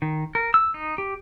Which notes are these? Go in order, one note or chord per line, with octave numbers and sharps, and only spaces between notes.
D#3
A#4
E6
D#4
G4